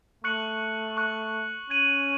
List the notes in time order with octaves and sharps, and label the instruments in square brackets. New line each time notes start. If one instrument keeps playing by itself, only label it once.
[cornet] A3 [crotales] C#6 F#6 C#7 F#7
[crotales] C#6 F#6 C#7 F#7
[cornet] C#4 [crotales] G#6 D#7 F#7